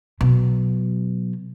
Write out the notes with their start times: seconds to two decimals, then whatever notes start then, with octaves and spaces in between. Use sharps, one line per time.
0.21 B2 F#3